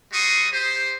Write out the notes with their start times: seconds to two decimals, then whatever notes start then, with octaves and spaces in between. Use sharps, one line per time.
0.13 G3 F#4 C6 C#6 D#6
0.52 G4 C5